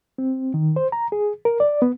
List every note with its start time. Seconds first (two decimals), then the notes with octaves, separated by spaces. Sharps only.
0.18 C4
0.54 D#3
0.76 C5
0.92 A#5
1.12 G#4
1.45 A#4
1.60 D5
1.82 B3